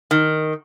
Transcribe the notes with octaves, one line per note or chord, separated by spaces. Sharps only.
D#3